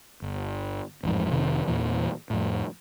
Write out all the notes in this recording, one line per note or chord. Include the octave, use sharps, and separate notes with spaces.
G1
A1 F2 G#2
F1 C3 D#3
E2 A#2 E3
F2 A2